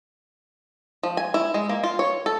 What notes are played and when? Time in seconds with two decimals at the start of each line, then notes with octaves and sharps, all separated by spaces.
1.03 F3
1.17 G#5
1.34 E4
1.54 G#3
1.69 A#3
1.84 F4
1.99 C#5
2.26 A4